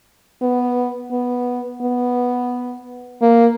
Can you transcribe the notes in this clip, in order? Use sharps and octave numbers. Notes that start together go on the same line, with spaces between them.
B3
B3
B3
A#3